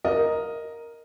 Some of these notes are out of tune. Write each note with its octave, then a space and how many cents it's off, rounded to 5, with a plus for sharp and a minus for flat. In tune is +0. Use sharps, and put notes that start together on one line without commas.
A#4 +0 D#5 +0